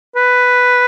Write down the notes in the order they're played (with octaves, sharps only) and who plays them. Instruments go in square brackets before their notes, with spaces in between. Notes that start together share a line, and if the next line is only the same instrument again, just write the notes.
[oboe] B4